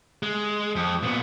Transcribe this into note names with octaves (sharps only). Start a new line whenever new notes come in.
G#3
F2
A#2 B3